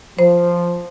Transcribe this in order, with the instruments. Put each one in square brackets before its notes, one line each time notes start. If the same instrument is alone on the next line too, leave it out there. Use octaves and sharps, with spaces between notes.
[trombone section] F3 [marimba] C5